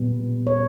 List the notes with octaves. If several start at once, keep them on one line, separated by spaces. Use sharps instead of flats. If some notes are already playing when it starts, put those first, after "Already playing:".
Already playing: A#2 G3 B3
C#5